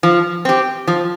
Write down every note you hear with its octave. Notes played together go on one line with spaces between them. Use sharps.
F3
C4 G4
F3